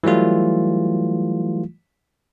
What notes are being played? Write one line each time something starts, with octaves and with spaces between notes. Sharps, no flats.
E3 F#3 G3 A3 F4